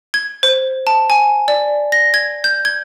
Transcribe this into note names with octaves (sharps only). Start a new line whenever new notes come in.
G#6
C5
A5
G#5
D5
A#6
G#6
G6
G#6